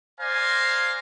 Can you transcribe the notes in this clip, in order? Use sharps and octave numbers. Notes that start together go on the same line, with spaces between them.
C5 D5 F5 G#5 A#5 C6